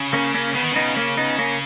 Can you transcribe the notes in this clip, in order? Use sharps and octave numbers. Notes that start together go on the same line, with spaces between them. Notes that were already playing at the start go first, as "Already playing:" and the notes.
Already playing: C#3
A#3 C#4
A#3 C#4
C#3 B3
D#3
C#3 B3 D#4
A#3 C#4
B3 D#4
A#3 C#4